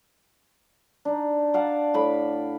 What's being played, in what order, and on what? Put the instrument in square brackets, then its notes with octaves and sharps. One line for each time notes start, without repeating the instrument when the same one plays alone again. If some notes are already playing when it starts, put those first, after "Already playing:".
[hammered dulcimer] D4 D#4
D5 F5 F#5 A5
A2 B5 D6